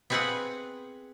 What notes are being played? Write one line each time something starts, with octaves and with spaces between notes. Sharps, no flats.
B3 C4 G#4 B4 F5 F#5